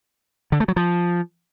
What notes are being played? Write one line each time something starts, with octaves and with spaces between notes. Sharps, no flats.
D3
A3
F#3
F3